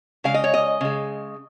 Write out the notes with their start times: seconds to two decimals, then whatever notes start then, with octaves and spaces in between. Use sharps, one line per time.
0.24 C#3 G#3 F5
0.34 D#5
0.44 C#5
0.54 D#5
0.81 C#3 G#3